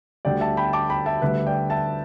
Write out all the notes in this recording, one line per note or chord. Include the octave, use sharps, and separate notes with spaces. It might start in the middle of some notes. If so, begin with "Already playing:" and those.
D2 D3 G3 D5 G5
E5 A5
G5 B5
A5 D6
G5 B5
E5 A5
D2 D3 G3 B4 E5
D5 G5
E5 A5